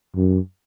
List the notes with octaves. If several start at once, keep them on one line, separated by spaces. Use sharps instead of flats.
F#2